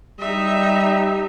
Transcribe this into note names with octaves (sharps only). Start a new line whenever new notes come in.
G3 D#4 E5